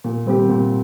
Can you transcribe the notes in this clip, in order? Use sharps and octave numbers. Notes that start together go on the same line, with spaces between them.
A#2
G3 C4 G4
A#2